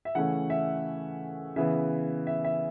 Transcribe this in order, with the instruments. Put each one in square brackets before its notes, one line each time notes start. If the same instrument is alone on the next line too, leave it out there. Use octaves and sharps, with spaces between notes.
[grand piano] E5
C#3 E3 A3 C#4 F#5
E5
C#3 E3 B3 E5
E5
E5